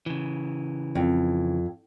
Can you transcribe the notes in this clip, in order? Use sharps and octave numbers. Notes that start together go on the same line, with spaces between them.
C#3 E3
F2